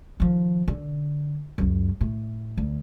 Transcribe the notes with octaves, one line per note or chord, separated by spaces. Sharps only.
D#3 F3
D3
C#2 F#2
A2
D2